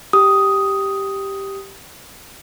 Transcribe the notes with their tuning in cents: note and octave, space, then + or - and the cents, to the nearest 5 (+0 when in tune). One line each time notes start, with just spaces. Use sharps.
G4 +0 D#6 +5